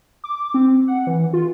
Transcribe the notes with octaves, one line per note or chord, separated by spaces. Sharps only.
D6
C4
F#5
E3
F4